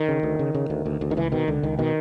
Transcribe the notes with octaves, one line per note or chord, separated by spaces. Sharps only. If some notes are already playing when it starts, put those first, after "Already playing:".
Already playing: D#3
C#3
D2
C#3
C#3
D2
D2
D2
D#3
C#2 E3
B2 D#3
C#2 D3
C#2 D#3
B2 D#3